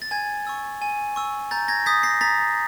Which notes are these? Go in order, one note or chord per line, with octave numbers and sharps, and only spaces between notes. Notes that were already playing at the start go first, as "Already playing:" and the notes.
A6
G#5 G#6
C#6 E6
G#5
C#6 E6
A#5 G6 A6
G#6 A#6
D#6 G6 A6 B6
A#6 C7
A#5 A6 B6